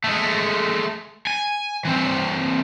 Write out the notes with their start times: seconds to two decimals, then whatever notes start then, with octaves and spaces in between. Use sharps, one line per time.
0.04 G#3 A3
1.27 G#5
1.85 E3 C4